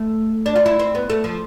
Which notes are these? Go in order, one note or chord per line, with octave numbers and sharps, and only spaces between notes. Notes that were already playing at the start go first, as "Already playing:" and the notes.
Already playing: A3
D4
F4
E4
C4
B3
A3
F3